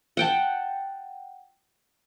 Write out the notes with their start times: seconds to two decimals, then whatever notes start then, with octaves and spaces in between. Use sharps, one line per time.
0.17 F#5 G5 A5